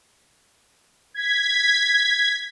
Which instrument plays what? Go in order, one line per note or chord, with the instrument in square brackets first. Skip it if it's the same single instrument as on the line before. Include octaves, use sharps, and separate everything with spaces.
[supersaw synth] G#6 B6